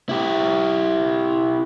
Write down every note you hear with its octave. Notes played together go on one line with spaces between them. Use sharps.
E4 G4